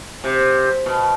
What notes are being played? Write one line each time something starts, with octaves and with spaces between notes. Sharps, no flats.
C3
B2